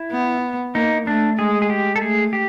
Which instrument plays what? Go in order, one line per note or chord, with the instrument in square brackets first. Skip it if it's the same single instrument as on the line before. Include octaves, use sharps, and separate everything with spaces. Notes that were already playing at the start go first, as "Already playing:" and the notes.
Already playing: [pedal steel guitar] E4
[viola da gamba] B3
[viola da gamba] A#3 [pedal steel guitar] D#4
[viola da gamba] A3 [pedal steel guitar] D4
[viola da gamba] G#3 [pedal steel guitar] G#4
[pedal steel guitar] G#4
G4
A4
[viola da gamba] A3 [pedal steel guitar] G#4
[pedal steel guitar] G4